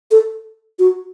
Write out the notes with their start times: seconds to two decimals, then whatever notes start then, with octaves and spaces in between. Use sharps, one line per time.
0.11 A4
0.79 F#4